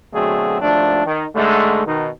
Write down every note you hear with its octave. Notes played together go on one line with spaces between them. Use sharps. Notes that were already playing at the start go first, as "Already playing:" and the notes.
B2 D3 F#3 A3 C4 G#4
G#1 D#2 F3 A3 D4
D#3
G#2 D3 G#3 A3
B2 D#3 D#4